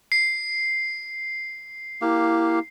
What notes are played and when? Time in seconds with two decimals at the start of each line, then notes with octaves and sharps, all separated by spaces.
0.12 C7
2.02 A#3 E4 G4 F5